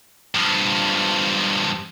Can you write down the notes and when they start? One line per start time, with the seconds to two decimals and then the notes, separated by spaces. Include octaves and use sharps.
0.35 G2 F3